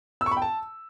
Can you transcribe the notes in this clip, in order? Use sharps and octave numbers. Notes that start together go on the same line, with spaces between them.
E6
C#6
B5
G5
A5